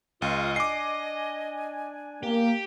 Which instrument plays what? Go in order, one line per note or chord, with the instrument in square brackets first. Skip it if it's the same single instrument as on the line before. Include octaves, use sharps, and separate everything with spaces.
[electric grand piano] C#2 [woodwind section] F4 [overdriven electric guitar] D#5
[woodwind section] D4 G#5 [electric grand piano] D6 C7
[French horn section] A#3 [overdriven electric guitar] G4